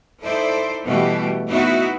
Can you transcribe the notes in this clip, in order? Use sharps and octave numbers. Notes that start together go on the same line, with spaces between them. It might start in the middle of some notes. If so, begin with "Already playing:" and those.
D#4 E4 A4 C5 D5
B2 E3 G3 A3 F#4 G4
B3 D#4 E4 F#4